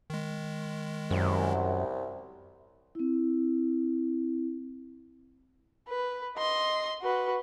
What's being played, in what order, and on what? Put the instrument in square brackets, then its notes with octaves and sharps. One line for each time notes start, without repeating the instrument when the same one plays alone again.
[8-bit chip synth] D#3 G#3
[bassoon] C2 [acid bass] F#2
[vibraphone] C4 E4
[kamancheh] B4
D#5 C6
F#4 B4